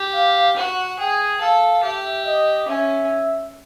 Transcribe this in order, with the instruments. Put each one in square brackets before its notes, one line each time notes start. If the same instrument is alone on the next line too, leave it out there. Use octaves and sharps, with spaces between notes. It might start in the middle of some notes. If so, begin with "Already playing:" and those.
Already playing: [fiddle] G4
[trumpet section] F5
[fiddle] F#4 [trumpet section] F#5
[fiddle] G#4 [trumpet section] G5
[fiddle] A4 [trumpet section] F5
[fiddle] G4 [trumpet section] E5
[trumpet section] D#5
[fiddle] C#4 [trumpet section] E5